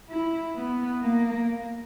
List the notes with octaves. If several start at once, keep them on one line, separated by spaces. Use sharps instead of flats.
E4
B3
A#3